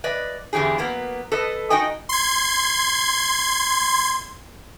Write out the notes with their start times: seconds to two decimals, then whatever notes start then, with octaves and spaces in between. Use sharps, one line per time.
0.04 B4 D5 D#5
0.53 E2 D3 E3 G4 G#4
0.78 F#3 A#3 B3
1.32 A4 B4 D#5
1.70 D#4 F#4 D#5 G5 G#5
2.09 C6 G#6